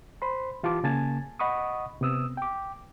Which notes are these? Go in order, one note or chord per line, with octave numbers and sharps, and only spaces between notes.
C5 B5 C6
E3 F4 G4 A5 D6
C#3 A#3 G#5 A5 G#6 A6
D#5 F#5 B5 C#6 D#6
C3 B3 D#6 E6
G5 D6